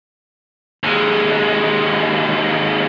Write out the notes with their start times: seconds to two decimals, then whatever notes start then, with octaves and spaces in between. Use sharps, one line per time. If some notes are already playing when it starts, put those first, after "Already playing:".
0.84 D#2 G#3